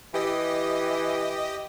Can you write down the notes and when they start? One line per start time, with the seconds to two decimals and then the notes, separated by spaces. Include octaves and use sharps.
0.14 E3 G4 D#5